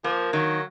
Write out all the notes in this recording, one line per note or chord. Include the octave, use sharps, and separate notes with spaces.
F3 A#3
D#3 F#3